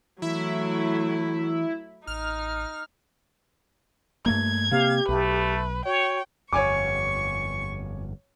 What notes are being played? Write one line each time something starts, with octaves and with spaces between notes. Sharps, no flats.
E3 F#3 A3 E4
A1 D#4 F6
G2 A3 A#3 G#6
C3 A#3 C4 G4 F5
B1 A3 B4
F#4 C#5 G5
G1 F2 C#5 G#5 C#6 D6